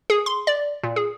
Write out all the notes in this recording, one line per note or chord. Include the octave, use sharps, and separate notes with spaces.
G#4
C6
D5
A#2
G#4